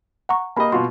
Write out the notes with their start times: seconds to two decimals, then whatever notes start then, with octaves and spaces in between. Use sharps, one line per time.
0.29 F#5 A#5 C#6
0.57 A#3 G4 D#5 A5 B5
0.72 B2 F4 F#4 C6